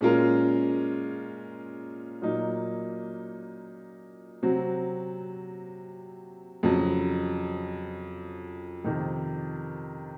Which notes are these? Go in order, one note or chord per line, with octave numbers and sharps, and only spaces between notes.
A#2 G#3 C#4 F4 A#4
A#2 F#3 A#3 D#4
C3 F#3 C4 F#4
F2 C#3 F#3
F2 C3 D#3